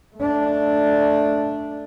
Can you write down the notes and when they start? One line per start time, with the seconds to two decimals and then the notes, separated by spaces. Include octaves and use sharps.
0.16 A3 D4